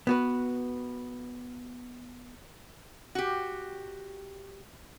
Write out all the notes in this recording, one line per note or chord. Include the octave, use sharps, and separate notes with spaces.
B3 F#4 B4
F#4 G4